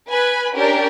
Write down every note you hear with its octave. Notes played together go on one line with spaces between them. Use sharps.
B4 G#5 B5
C#4 D4 G4 A#4